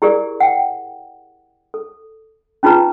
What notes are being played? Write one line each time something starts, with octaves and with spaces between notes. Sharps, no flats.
E4 G4 G#4 A#4 D5
F#5 G5
A4
C#4 D#4 F4 G#4 B4 A#5